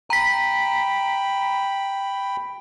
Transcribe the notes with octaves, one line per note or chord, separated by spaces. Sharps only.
G5 A#5 B5 B6